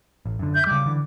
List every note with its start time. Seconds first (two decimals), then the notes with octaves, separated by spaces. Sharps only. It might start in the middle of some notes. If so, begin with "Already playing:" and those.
0.26 A1
0.39 F#2 D3
0.55 E5 G6
0.67 C#3 G3 D6
0.86 D3 E3